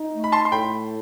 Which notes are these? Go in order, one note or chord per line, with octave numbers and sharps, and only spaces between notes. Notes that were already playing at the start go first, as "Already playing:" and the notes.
Already playing: D#4
A3
B5
A5 C6
C6
A2 G5 B5